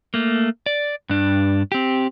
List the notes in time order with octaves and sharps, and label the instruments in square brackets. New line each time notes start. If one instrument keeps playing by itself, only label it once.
[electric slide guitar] A3 A#3
D5
G2 D4
C4 G4